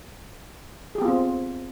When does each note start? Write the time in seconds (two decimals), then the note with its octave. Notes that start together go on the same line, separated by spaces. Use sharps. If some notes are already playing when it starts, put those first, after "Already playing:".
0.95 G#4
0.98 G4
1.02 B3
1.05 F4
1.08 C4